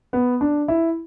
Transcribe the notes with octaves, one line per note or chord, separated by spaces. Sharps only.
B3
D4
E4